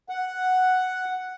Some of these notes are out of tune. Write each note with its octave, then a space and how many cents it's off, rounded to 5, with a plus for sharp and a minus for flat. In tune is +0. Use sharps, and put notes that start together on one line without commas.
F#5 +0